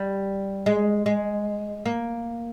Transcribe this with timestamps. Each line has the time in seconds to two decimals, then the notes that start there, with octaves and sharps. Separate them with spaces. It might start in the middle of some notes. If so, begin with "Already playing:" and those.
Already playing: G3
0.66 G#3
1.06 G#3
1.86 A#3